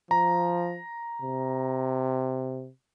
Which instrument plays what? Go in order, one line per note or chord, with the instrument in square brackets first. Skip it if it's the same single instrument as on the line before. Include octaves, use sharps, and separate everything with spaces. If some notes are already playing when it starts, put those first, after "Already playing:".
[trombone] F3 [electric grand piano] A#5
[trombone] C3